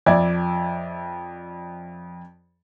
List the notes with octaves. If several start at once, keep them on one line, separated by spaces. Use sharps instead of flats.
F2 D5 E5 G#6